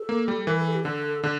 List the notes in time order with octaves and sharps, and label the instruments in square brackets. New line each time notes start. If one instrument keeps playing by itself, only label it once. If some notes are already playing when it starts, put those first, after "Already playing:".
Already playing: [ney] A4
[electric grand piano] A#3
G3
[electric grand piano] E3 [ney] A#4
[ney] A4
G4
[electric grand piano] D3 [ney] A4
[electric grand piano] D3 [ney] A4